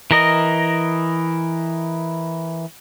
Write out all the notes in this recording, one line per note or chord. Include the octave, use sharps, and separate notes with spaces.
E3 A#4 D#5